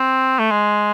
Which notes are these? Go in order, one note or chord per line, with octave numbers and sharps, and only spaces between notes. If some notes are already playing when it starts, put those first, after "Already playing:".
Already playing: C4
A3
G#3